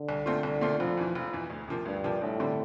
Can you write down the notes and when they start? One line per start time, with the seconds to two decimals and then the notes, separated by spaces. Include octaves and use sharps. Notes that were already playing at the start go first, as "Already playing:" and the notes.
Already playing: D3
0.09 C2
0.26 A#2 A3 C4 F4
0.43 C2
0.61 A#2 A3 C4 F4
0.79 F1 F3
0.97 E2 E3
1.15 F1
1.33 E2 E3
1.50 D2
1.68 C3 F3 A#3
1.85 D2 G2
2.04 C3 F3 A#3
2.21 G1 A2
2.40 D3 G3 C4